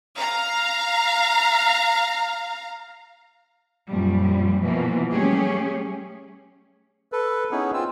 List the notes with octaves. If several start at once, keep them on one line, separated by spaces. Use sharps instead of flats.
F5 A#5
F#2 A#2 F3 G3
B2 E3 F3 A#3
F#3 G3 A3 C#4 G4 G#4
A4 B4
B3 C#4 D#4 E4 G#4
C4 F4 E6